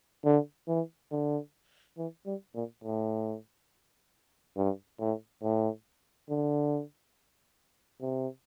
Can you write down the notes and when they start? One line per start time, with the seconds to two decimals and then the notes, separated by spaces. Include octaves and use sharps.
0.25 D3
0.68 E3
1.12 D3
1.98 E3
2.26 G3
2.55 A#2
2.84 A2
4.57 G2
5.00 A2
5.43 A2
6.30 D3
8.02 C3